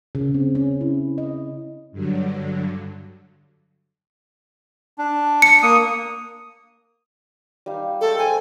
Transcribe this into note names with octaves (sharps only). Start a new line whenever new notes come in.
C#3
C4
C#4
E4
D#5
G2 D3 F#3
D4
C#7
A#3 D#6
G3 D#4 F5
G#3 A3 A4 G5
A4 C5 G#5